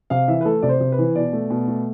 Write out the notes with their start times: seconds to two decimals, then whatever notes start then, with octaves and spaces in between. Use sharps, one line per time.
0.10 C3 F5
0.28 E3 E5
0.41 B4
0.45 A3 A4
0.62 C3 D5
0.69 C5
0.81 C3
0.92 B4
0.98 E3
1.15 B2 D5
1.33 A3
1.50 B2
1.68 A3